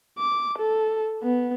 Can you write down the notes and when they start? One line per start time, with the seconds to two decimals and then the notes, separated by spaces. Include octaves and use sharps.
0.18 D6
0.58 A4
1.23 B3